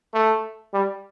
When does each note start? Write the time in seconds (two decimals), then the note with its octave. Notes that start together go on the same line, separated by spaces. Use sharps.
0.14 A3
0.73 G3